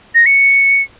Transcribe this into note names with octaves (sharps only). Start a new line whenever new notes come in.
A#6
C#7